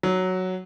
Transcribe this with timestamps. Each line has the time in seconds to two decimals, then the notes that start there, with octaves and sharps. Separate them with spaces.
0.03 F#3